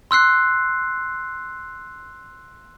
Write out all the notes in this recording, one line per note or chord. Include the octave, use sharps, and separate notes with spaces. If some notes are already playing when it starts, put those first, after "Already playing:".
C6 E6 F#6 C7